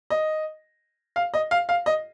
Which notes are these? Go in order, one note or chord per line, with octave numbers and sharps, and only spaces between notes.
D#5
F5
D#5
F5
F5
D#5